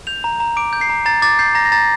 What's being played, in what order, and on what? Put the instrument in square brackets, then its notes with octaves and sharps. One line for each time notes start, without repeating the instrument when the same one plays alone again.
[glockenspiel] G6 F7
A#5
A#5
D6 D7
G6
C7
A#5
A#5 A6
D6 A6
G6 C7
A#5 A#6
A#6
A#5 A6